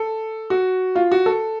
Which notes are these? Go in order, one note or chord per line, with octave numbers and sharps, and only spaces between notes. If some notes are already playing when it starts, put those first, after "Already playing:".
Already playing: A4
F#4
F4
F#4
A4